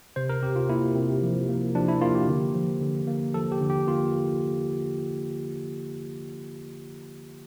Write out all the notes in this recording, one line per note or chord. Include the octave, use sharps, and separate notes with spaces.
C3 C5
A#4
C3 G4
F4
A#3 E4
C3
F3
A#3
F3 D4
E4
A#3 F4
G4
D3
F3
D3
A#3
F3 A4
G4
D3
G4
A#3 F4